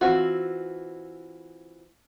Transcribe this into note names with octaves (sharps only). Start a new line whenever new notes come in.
E3 C4 F4 F#4